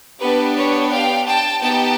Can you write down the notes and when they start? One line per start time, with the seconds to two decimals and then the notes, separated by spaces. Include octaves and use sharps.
0.21 B3 D4 G4 B4
0.57 B4 C#5
0.91 F5 G5
1.26 G5 A5
1.61 B3 D#4 G4 G5 A5